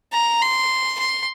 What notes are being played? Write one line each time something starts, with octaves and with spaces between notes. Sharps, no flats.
A#5
C6
C6